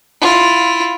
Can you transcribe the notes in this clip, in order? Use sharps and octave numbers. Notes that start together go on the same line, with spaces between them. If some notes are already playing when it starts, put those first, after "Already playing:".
E4 F4